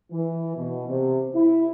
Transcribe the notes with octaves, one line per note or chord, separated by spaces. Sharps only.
E3
B2
C3
E4